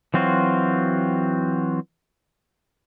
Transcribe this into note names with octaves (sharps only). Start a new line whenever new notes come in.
E3 F#3 C4 F4 F#4